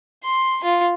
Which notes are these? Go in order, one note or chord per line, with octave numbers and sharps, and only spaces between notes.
C6
F4